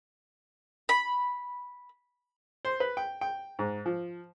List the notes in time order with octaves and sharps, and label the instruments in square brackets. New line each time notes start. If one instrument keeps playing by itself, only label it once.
[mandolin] B5
[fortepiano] C5
B4
G5
G5
G#2
F3